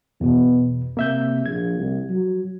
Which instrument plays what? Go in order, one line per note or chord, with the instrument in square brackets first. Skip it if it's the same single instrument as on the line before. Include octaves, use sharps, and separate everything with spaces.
[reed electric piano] E2 B2 [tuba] B3
[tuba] C3 [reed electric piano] A#3 E5 G6
[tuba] A#1 [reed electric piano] G#6
[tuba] C2
F#3